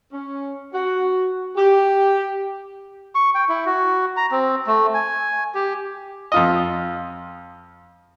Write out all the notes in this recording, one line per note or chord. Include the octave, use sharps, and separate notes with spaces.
C#4
F#4
G4
C#6
G5
E4
F#4
A#5
C4
A3
G#5
G4
F2 F4 D#5